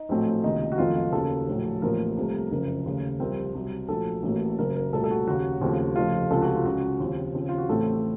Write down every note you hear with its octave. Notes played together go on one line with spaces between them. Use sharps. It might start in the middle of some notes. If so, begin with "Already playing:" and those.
Already playing: D#4
A#1 A2 F#3 A3 C4
C#2 C3 D#3 A#3 D#4
F#4
F#1 F2 D#3 A3 C4 F4
D#2 C#3 F#3 A#3 A4
A#1 A2 F#3
A1 A2 F3 A#3 A#4
C2 C3 F3 A3
F#1 F2 C#3 A#4
D#2 C#3 A3
C2 C3 F3 C4 A#4
C2 C3 F#3
A#1 A#2 F#3 A3 A4
A1 A2 F#3 A#3
F#1 F#2 C#3 A#4
A#4
C2 A#2 F#3 A3 A4
A4
F#4
D#2 C#3 F#3 F#4
D#2 C#3 F3 A3 C4
F1 F2 C#3 A3 F4
C#2 C3 F3 A4
F#4
F4
C#2 C#3 F#3 F#4
D#2 C#3 F3 C4
D#2 C#3 F3 C4
F4
F#4
A1 A2 A3 C4 A4